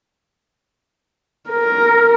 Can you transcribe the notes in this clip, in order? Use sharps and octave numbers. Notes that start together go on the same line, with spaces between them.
A#4